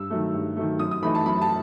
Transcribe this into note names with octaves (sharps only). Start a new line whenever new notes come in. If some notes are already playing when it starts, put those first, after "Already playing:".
Already playing: G2 E6
D#3 F#3 A3
G2
D#3 F#3 A3
F#2 D#6
D#6
E3 A3 D#4 B5
A5
F#2 B5
A5